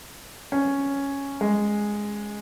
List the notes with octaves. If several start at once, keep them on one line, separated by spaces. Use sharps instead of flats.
C#4
G#3